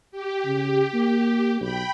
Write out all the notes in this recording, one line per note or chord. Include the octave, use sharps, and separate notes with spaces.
G4
C#3
A#3
B1 G5 B5